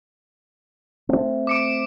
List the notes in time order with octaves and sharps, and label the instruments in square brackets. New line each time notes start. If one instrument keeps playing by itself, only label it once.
[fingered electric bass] A3 C4
[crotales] D6 C#7 D7